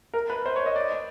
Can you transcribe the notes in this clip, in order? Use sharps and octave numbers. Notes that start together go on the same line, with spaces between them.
A#4
B4
C5
C#5
D#5
D5